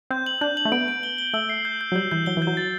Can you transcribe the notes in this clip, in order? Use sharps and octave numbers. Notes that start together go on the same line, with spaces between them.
C4 G6
F#7
D4 G6
F#7
A3
B3 D7
D7
G7
G7
A3 E6
C7
G6
G6
F#3
G3 G6
E3 G6
F#3 G7
E3
F#3 G6
A6